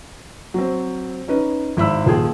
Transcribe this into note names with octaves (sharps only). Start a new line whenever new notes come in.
F#3 C4
C#4 D#4 B4
G#1 E4 B5 E6
D#1 F4 G#4 G5